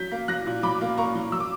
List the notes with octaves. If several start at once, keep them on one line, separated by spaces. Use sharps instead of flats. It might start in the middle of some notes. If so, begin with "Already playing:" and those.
Already playing: F#3 G6 B6
A#3
F#3 F#6 A#6
A#2
F#3 B5 D6
A#3
A#3 A#5 C#6
F#3
F#3 E6
D6